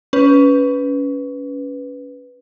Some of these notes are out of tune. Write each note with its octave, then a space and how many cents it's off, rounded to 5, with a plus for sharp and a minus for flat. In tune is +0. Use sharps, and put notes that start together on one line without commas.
C#4 +20 B4 +0